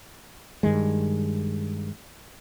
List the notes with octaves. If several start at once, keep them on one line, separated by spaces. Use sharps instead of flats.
G2 D#3 G#3